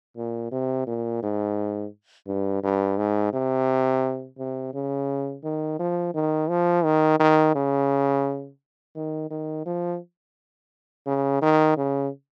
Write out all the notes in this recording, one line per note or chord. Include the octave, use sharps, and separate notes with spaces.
A#2
C3
A#2
G#2
G2
G2
G#2
C3
C3
C#3
D#3
F3
D#3
F3
D#3
D#3
C#3
D#3
D#3
F3
C#3
D#3
C#3